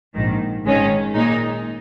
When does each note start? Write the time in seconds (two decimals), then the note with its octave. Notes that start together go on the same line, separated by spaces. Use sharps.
0.14 A#1 G#2 D#3
0.64 G#1 G#2 D#3 G#3 C#4
1.14 A#2 G#3 D#4